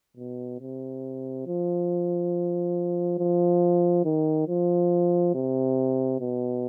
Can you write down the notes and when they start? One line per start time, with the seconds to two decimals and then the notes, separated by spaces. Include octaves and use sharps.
0.17 B2
0.60 C3
1.47 F3
3.18 F3
4.05 D#3
4.48 F3
5.35 C3
6.20 B2